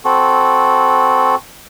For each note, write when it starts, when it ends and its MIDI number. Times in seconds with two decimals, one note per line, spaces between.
0.05 1.35 60
0.05 1.35 66
0.05 1.35 69